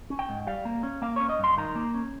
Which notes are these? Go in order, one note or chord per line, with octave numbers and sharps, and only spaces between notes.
C#4
G5
G#2
G3 F5
A#3
C#4
A#3 F5
C#4 C#5
D#5
G2 C6
D#3 A#5
A#3
C#4